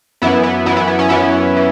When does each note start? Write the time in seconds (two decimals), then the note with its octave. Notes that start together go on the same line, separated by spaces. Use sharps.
0.22 F#2 E3 B3 E4
0.43 B3
0.66 F#2 E3 B3 E4
0.77 B3 E4
0.88 B3
0.99 C#4
1.09 F#2 E3 B3 E4
1.56 E3